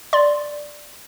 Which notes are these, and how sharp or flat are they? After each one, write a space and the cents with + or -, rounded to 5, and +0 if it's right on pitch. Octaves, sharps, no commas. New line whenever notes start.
D5 +0 C6 +0